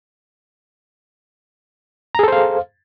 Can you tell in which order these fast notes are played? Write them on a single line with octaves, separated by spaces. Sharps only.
A#5 G#4 A4 C5 F5